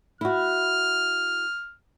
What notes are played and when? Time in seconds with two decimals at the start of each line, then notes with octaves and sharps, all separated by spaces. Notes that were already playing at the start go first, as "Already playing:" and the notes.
0.21 E4 F#4 F6